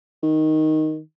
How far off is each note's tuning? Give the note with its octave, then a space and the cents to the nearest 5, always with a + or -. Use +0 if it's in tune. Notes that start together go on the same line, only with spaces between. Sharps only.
D#3 +0